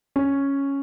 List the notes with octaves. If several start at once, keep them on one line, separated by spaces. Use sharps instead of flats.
C#4